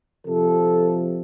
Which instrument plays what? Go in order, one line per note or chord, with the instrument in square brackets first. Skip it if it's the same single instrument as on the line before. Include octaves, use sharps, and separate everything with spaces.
[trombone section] C3 F3 A4